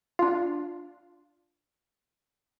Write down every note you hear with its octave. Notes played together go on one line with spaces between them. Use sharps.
D4 F4